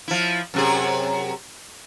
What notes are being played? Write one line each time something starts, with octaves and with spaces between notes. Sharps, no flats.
F3 E4
F#2 C3 G#4